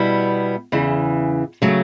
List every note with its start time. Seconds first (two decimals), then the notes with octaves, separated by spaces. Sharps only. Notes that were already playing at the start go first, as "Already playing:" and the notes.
Already playing: B2 G3 B3 E4
0.72 E2 C#3 E3
1.62 C#3 F#3 A3